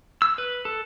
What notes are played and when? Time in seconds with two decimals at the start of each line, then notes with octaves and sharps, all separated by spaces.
0.22 E6
0.38 B4
0.65 A4